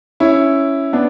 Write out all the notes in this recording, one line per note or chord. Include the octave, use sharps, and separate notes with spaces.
C#4 E4
B3 D4